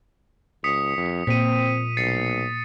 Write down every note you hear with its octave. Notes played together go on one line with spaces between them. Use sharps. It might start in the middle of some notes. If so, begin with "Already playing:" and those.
C#2 D#6 B6 C#7
F2
A#2 C4 B6 D#7
B1 A6 C7 C#7